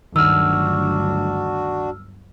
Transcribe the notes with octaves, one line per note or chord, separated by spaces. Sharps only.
G1 D2 D#3 F#3 D4 F#4 E6 F6